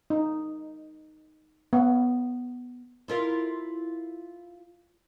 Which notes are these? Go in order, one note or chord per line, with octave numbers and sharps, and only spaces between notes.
D#4
B3
E4 F4 A#4